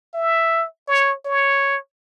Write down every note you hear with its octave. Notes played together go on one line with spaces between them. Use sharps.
E5
C#5
C#5